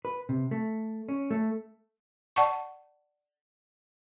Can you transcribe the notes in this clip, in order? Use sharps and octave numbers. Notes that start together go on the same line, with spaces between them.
B4
C3
A3
C#4
A3
D5 F#5 A5 C#6